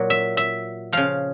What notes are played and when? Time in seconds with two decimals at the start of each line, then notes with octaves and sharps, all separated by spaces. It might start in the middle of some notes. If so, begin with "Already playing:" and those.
Already playing: A#2 F#3
0.10 E5
0.37 E5
0.92 C#3 F3 F5